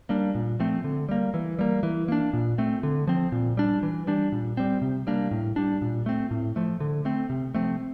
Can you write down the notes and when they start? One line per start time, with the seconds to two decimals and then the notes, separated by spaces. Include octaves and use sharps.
0.09 G3 A#3 D4
0.35 A#2
0.60 F3 A3 C4
0.84 D3
1.09 G3 A#3
1.34 E3
1.59 G3 A#3
1.83 E3
2.08 A#3 D4
2.33 A#2
2.58 A3 C4
2.83 D3
3.07 F3 C4
3.32 A#2
3.57 G3 D4
3.83 E3
4.07 G3 D4
4.32 A#2
4.57 G3 C4
4.82 C3
5.07 G3 A#3 D4
5.31 A2
5.56 G3 D4
5.82 A#2
6.06 A3 C4
6.31 A2
6.56 F3 A3
6.80 D3
7.05 A3 C4
7.30 C3
7.55 F3 A3 C4